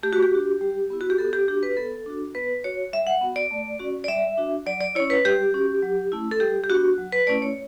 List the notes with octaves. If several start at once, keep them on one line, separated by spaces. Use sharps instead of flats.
A3 G4
F#4
G4
D4 F#4
G3
B3 E4
F#4
G4
B3 A4
G4
D4 F#4 G4
B4
B3 A4
D4 F#4
B3 B4
F#4 C#5
G3 E5
F#5
B3 F#4
D5
A3
C#4 F#4
D5
G3 E5
D4 F#4
F#3 D5
D5
C#4 E4 C#5
B4
G3 G4
C#4 F#4
F#3
A3 C#4 E4
A4
G3 G4
G4
B3 D4 F#4
F#3
B4
A3 C#4 E4 D5
C#5